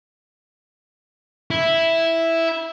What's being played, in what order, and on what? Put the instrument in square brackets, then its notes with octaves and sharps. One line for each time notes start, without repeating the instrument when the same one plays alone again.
[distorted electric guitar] E4